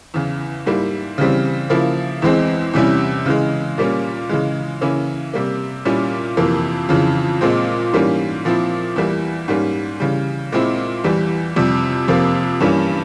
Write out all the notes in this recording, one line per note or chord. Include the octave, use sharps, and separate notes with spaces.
E2 C#3 E3
G#2 G3 A#3 E4
C#3 E3 G3 C4
C#3 F3 A#3 E4
E2 E3 G#3 C4
E2 C3 G3 C#4 E4
C#3 E3 G#3
A#2 G3 A#3 C#4
C#3 E3 G#3
C#3 E3 A#3 C#4 E4
C3 G3 A#3
A#2 G3 C#4 E4
F2 C3 E3 A#3
F2 C#3 E3
A#2 G#3 C4
G#2 E3 G3 A#3 C#4
A#2 F3 C4 E4
E2 E3 G3 A#3 E4
G#2 G3 A#3 C#4
C#3 E3 G3
A#2 G#3 C4 E4
E2 E3 G3
F2 C3 G3
F2 C3 F3 A#3
G2 E3 G3 A#3 C#4